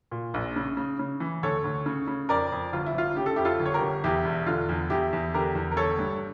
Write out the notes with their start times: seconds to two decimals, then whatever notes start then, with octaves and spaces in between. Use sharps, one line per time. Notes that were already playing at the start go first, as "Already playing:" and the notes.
0.12 A#2
0.34 A#1
0.56 C#3
0.77 C#3
0.99 C#3
1.20 E3
1.43 D2 A4 C#5
1.64 D2
1.86 C#3
2.08 C#3
2.29 F2 A#4 D5
2.52 F2
2.73 G1 F4
2.86 E4
2.94 G1 F4
3.16 C#3 G4
3.26 A4
3.36 F2 E4 G4
3.45 F4 A4
3.60 G1
3.66 C#5
3.74 G4 A#4
3.81 G1
4.04 E2 E4 G4
4.25 E1
4.47 D3 F4
4.69 E2
4.90 E2 E4 G4
5.13 E2
5.34 D3 G4 A#4
5.55 E2
5.71 A#4
5.77 G1 A4 C#5
5.99 G2